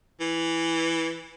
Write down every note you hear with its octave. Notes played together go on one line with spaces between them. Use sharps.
E3